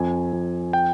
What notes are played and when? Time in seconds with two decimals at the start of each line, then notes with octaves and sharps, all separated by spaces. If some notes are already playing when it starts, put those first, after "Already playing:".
Already playing: F2 G#5
0.33 F2
0.73 G5